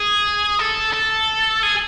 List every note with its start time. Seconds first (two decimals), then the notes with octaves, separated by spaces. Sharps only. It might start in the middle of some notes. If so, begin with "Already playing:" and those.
Already playing: G#4
0.59 A4
0.93 A4
1.63 G#4